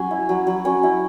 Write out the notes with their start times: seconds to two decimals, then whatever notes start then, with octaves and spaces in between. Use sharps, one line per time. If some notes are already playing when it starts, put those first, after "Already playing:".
Already playing: F#3 C#4 G#5
0.11 E4
0.29 F#3
0.47 F#3
0.65 C#4
0.83 E4